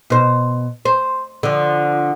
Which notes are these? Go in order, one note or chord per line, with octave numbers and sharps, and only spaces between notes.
B2 C5
C5
D3 F3